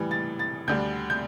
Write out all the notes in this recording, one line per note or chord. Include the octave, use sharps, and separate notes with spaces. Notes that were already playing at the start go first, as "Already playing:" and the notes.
Already playing: A2 E3 G3
A6
A6
D2 D3 G3 G6
G6